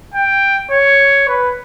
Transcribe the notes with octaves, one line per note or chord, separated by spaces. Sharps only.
G5
C#5
B4